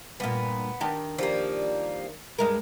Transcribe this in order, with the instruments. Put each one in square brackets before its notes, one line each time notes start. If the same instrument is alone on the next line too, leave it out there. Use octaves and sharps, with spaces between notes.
[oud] G2 A#2 [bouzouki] B3
[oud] D#3 D4 G4
[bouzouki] F3 G3 A#3
[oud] G2 G#3 A#4